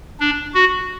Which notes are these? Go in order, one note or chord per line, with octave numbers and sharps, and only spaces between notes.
D4
F#4